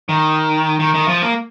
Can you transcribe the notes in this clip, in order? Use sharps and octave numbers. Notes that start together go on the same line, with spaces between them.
D#3
D#3
D#3
F3
A#3